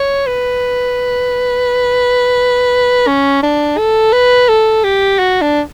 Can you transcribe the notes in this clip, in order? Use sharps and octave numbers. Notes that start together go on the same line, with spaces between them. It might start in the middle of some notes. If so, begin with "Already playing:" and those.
Already playing: C#5
B4
C#4
D4
A4
B4
A4
G4
F#4
D4